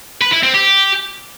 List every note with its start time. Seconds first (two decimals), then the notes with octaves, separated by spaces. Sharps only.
0.22 B4
0.32 E4
0.43 C4
0.54 G4